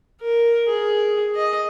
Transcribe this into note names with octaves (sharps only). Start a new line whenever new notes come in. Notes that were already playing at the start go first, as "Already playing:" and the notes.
A#4
G#4
D#5